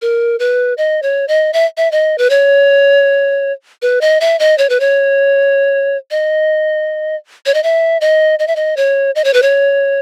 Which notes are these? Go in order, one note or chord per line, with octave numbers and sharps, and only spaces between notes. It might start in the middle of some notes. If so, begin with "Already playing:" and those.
A#4
B4
D#5
C#5
D#5
E5
E5
D#5
B4
C#5
B4
D#5
E5
D#5
C#5
B4
C#5
D#5
C#5
D#5
E5
D#5
D#5
E5
D#5
C#5
D#5
C#5
B4
C#5